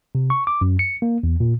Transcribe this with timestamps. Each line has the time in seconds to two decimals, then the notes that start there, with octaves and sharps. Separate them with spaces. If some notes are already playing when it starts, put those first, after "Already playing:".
0.15 C3
0.30 C#6
0.47 D6
0.61 F#2
0.79 C#7
1.02 A#3
1.23 E2
1.40 A#2